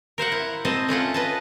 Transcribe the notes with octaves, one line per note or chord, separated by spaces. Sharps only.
A#4 C5 F5 F#5
E4
C4 C5 D#5 A5
A3 C#4 F4 F#5
B4 D#5 A5